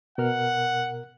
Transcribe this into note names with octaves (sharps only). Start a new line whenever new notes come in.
B2 A#4 F#5 F6